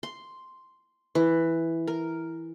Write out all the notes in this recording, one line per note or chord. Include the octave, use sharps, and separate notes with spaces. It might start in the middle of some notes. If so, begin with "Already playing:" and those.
C6
E3
A#4